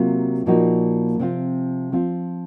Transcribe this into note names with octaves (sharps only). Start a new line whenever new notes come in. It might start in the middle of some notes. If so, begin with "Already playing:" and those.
Already playing: C3 F#3 A#3 F4
A#2 F3 A#3 D#4 F#4
C3 F3 C4 F4
F3 C4 F4